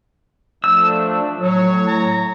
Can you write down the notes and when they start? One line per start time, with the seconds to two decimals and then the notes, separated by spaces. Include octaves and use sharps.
0.64 F3 A3 D4 E6
1.40 A2 F#3 C#5
1.87 A#5